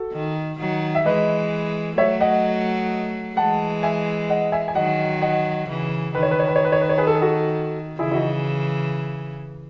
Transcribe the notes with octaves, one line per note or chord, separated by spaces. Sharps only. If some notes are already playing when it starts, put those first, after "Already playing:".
Already playing: F#4 A4
D#3
D#3 F#3
E5
E3 G#3 B4 D#5
F#3 A3 C#5 E5
D#5 F#5
E3 G#3 F#5 A5
E5 G#5
D#5 F#5
E5 G#5
G#5
D#3 F#3 D#5 F#5
D#5 F#5
C#3 E3
D#3 B4
C#5
B4
C#5
B4
C#5
B4
C#5
B4
C#5
G#4 B4
A4
G#4
F#4 A4
C#3 E3 E4 G#4
E4
D#4 F#4